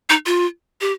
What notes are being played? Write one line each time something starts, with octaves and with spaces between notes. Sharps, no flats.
D#4
F4
G4